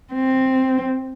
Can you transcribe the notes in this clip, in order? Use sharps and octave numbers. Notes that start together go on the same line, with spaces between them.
C4